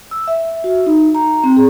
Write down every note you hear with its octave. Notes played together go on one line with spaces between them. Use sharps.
E6
E5
F#4
D#4
A#5
C4
G#4